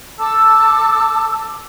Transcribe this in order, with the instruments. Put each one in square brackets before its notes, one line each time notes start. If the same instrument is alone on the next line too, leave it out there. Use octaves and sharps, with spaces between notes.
[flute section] A4 A5 D6 E6